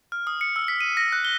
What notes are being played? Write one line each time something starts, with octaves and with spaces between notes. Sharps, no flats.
F6
D#6
C#7
E6
B6
D#7
A#6
F#6
G7